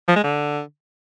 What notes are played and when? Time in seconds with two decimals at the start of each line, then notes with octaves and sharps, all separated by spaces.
0.08 F3
0.16 G#3
0.24 D3